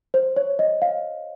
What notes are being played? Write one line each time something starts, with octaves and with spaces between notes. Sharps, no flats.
C5
C#5
D#5
F5